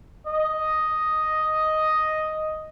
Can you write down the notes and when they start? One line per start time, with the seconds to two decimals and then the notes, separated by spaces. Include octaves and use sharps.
0.27 D#5